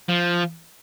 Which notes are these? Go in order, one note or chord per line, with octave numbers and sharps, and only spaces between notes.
F3